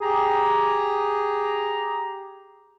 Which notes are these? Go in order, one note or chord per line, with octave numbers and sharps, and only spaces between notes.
G4 G#4 A#5